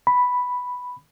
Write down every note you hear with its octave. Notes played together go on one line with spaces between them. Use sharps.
B5